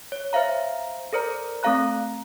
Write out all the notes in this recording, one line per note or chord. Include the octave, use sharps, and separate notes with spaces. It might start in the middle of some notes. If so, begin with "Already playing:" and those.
C#5
C5 E5 F5 A#5
A4 A#4 C5 D5 A#5
A3 C4 A4 F5 A#5 F#6